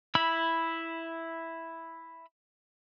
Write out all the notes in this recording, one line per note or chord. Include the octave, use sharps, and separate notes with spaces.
E4 B5 E6